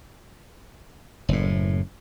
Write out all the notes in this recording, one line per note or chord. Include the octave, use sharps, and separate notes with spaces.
F#1 A2